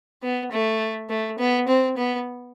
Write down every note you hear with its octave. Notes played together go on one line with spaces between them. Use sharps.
B3
A3
A3
B3
C4
B3